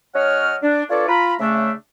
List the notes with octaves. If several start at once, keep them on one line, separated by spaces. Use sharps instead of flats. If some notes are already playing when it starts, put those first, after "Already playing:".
F#3 C#4 C#5 D#5 F#5 F6
D4
D4 F4 A4 B4 C#5 D5
F4 A#5 B5
C#3 A3 D4 E5